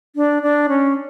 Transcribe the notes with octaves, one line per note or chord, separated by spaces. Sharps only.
D4
D4
C#4